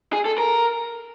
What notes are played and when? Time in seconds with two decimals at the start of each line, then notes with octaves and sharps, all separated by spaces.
0.13 G#4
0.25 A4
0.38 A#4